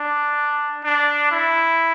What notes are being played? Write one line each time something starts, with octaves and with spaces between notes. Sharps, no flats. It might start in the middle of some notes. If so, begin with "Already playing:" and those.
Already playing: D4
D4
E4